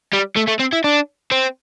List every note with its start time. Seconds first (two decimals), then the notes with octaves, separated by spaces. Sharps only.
0.13 G3
0.37 A3
0.48 A3
0.60 C4
0.73 E4
0.84 D4
1.32 C4